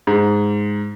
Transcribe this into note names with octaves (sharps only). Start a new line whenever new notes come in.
G#2